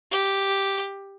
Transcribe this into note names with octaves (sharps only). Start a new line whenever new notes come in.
G4